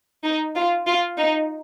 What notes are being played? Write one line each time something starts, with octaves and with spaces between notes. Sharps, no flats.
D#4
F4
F4
D#4